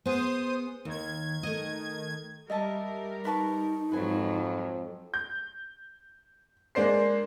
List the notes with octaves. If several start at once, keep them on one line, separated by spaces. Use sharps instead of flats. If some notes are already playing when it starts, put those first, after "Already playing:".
B3 G#4 C5 D#6
D#2 D#3 G#6
A3 D#5
G3 A#4 D#5 E5 A5
D#4 B4 A5 C#6
F2 G#2 F3 F#3 B4 G#5
G6
G#3 A#3 D4 C5 C7